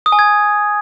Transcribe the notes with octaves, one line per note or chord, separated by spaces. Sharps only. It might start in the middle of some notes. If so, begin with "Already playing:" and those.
D#6
G#5
G#6